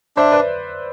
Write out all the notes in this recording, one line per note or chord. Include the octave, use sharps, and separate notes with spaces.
D4 C5 E5
B4 D5